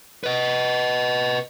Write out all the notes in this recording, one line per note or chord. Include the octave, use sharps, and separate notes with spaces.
B4 D#5